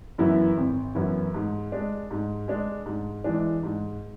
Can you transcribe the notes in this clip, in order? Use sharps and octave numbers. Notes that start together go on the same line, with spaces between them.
F#2 E3 B3 E4
G#1
F#2 E3 B3 E4
G#2
G#3 D4
G#2
G#3 D4
G#2
E3 G#3 D4
G#2